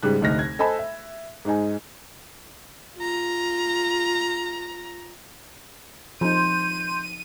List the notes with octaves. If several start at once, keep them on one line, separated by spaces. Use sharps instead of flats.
G#2 C#3 G3 F#6
F1 D2 D#4 F6 A#6
G#6
A4 C5 D#5 G#5 B5 E6
E5
G#2 G#3 D#4 G#5
F4 A#5
F3 D#4 C6 G6 D#7